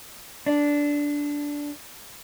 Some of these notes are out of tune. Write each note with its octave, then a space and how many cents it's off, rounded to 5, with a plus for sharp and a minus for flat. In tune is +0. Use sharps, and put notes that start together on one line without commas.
D4 -10